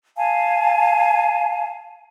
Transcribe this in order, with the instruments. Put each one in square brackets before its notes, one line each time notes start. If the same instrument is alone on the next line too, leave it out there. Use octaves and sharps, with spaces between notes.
[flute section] F5 G#5 A5